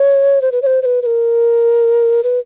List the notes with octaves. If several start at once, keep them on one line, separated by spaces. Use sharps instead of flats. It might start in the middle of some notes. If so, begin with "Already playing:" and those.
Already playing: C#5
C5
B4
C#5
C5
C5
B4
B4
A#4
B4